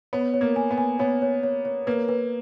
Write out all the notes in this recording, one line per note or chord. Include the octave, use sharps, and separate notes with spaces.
B3 C#5
C#5
A#3
G#5
B3
G#5
B3 C#5
C#5
C#5
C#5
A#3 B4
B4